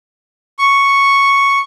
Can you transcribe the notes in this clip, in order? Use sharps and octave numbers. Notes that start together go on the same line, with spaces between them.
C#6